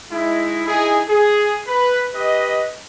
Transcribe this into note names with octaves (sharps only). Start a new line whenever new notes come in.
G#3 D#4 E4
D#4 E4 G#4
G#4
B4
G4 B4 D#5